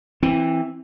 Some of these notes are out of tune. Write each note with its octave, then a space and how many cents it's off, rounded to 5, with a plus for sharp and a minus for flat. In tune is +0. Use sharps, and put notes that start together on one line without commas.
E3 +0 C4 +15